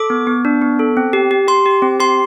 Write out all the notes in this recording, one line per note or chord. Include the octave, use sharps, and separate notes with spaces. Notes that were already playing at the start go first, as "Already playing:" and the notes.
Already playing: A4 D6
B3
B3
D4
B3
A4
C4
G4
G4
G4 C6
G4
C4
G4 C6